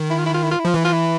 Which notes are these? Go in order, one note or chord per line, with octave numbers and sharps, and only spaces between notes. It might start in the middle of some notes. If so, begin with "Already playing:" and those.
Already playing: D#3
E4
F4
E4
F4
E4
F4
E4
F3 F4
E3 E4
F4
E4